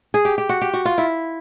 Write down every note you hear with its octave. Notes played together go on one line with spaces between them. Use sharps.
G#4
G4
G4
F#4
G4
F#4
F4
E4